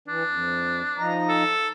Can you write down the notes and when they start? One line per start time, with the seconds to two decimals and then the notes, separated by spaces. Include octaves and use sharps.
0.08 E3 D4
0.27 F2
0.98 F3 D#4 A#5
1.29 A4